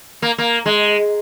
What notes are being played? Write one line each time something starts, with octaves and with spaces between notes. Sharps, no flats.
A#3
A#3
G#3